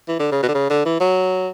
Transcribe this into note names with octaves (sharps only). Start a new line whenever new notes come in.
E3
D3
C#3
B2
D3
C#3
D3
E3
F#3